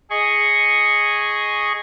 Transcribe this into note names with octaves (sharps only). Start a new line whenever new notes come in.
G#4 D#5 C#6